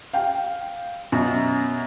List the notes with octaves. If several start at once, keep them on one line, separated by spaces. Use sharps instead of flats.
F5 G5
F#2 B2